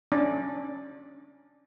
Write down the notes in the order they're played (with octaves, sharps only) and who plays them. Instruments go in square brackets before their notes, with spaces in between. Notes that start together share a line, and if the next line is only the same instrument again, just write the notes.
[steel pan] C#4 D4 D5